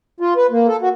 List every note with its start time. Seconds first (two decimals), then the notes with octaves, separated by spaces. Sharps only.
0.20 F4
0.37 B4
0.51 A#3
0.68 A4
0.81 F#4